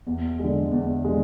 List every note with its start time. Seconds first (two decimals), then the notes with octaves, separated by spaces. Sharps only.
0.07 E2
0.39 G#3
0.44 D3
0.71 E2
1.04 D3 G#3